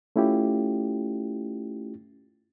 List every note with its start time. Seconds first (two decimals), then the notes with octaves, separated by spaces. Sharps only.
0.16 A3 C#4 E4 F4 G4